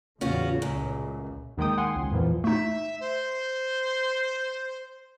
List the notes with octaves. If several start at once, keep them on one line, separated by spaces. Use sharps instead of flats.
E2 A2 C#3 C#4 F4 F#4
C#2 F#2 A#2
D#2 D#3 G#3 G5 D#6
F#5 G#5 C6
C#2
F2 A#2 E3 F3
A3 D#4 E5
C5